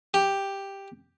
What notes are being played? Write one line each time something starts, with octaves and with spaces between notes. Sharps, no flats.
G4